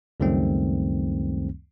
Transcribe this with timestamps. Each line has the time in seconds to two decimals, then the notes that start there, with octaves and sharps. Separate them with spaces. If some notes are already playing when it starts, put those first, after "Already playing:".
0.20 C#2 F#2 D#3 G3 A3 C4